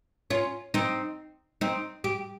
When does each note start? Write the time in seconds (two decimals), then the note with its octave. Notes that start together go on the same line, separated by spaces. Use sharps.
0.30 C#4 F4
0.74 C4 D#4
1.61 C4 D#4
2.04 G4